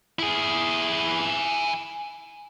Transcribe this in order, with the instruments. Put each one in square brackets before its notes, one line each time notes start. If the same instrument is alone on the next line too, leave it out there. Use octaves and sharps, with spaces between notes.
[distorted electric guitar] E4 G#4